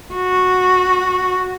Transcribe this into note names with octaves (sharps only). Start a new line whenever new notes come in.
F#4